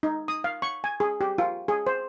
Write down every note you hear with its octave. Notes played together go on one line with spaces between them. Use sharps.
D#4
D#6
F5
C#6
G#5
G#4
G4
F4
G#4
C5